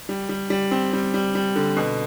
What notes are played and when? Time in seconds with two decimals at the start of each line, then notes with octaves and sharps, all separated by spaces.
0.09 G3
0.29 G3
0.50 G3
0.71 C4
0.93 G3
1.14 G3
1.35 G3
1.56 D3
1.77 B2